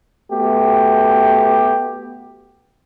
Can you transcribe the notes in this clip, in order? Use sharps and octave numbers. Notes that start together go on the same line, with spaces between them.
A3 B3 F#4 G4